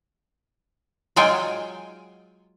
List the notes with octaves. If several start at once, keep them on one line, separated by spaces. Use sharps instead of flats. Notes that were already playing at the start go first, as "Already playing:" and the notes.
F#3 G#3 F4 G5 G#5